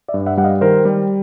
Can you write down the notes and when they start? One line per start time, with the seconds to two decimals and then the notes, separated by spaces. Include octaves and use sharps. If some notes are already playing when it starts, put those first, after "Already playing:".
0.08 D5 E5
0.14 G2
0.26 E5 F#5
0.37 G3 F#5
0.44 D#5 F5
0.61 D#3 A#4 C5
0.85 G3